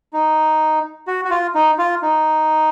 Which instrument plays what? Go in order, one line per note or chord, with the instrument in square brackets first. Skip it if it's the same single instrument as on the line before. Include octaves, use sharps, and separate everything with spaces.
[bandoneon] D#4
F#4
F#4
F4
D#4
F4
D#4